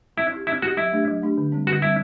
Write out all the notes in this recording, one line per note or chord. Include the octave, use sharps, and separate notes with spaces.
C4 E4
E4 G4
C4 E4
E4 F#4 G4
F#3 E4
A3 D4 G4
F#3
A3 D4 G4
D3
G3 C4
D3 F#4
G3 C4 E4